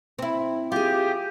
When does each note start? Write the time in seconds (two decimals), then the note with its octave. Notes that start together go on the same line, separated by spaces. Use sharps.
0.19 C4 E4
0.72 F4 G4 G#4